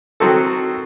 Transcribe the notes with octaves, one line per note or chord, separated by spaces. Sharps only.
D#3 F#3 C4 F#4 A4